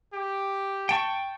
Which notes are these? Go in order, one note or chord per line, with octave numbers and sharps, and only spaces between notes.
G4
G5 A5 C#6